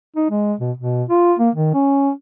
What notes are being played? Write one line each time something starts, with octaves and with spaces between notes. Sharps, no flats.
D#4
G#3
B2
B2
F4
A#3
D#3
C#4